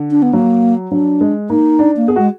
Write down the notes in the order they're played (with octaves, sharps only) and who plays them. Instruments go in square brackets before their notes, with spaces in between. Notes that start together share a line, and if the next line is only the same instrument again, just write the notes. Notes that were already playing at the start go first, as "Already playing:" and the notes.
Already playing: [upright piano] D3
[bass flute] D4
B3
[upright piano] F#3 [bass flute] A#3
[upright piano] F#3 [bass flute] D4
[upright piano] G#3
[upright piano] A#3 [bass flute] D#4
[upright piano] D4
[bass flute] A#3
[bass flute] B3 [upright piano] G#4
[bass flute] G#3 [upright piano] F#4